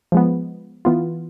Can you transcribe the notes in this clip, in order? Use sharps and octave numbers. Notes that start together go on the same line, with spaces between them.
F3 G#3 B3
E3 B3 F4